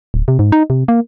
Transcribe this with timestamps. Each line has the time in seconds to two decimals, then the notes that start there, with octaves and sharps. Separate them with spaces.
0.14 D1
0.28 C3
0.39 G#2
0.52 D#4
0.70 C3
0.88 A#3